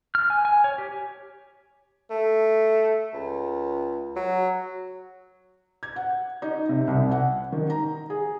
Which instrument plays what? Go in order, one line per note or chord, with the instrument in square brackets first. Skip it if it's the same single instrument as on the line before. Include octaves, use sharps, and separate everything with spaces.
[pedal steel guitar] F6
G#5
G#5
C#5
G4
[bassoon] A3
C#2
F#3
[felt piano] G#6
F#5
D#4
C3
C2
F#5
D#3
A#5
G#4